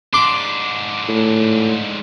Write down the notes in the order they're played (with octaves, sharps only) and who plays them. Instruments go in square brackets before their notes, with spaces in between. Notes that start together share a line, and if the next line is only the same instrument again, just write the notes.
[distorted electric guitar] G#2 D4 [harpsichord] C6 D6
[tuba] A2